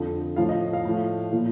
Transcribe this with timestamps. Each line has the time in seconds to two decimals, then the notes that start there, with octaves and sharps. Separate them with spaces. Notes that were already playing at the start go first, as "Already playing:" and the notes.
Already playing: F2 D3 F3
0.36 A2 F3 F5
0.49 D#5
0.73 F5
0.85 A2 F3
1.32 A#2 F3